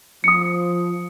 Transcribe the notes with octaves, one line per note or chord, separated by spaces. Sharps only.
F3 D#6 C#7